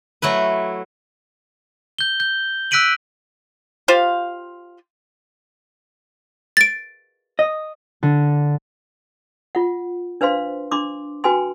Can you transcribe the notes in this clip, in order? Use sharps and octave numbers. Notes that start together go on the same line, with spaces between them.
F#3 A3 E4 B4
G6 G7
G6
E6 F#6 B6 D7 D#7 F#7
F4 G4 C5 F5
A6 D7
D#5
D3
F4 F#5
D4 B4 C5 F5 C6
D4 C6 D6
F#4 B4 G5 G#5 C6